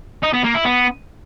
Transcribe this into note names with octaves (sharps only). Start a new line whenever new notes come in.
D#4
B3
A#3
E4
B3